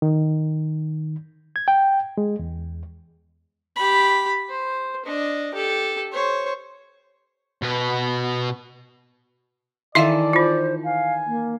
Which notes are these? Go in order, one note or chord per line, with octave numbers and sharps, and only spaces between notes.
D#3
G#6
G5
G#3
E2
G4 B5
C5
D4 D#5
G4 A4
C5 C#5
B2 B4
D#3 E3 E4 A4 D5 E5 F5
D#4 F4 C5
F5 G#5
A#3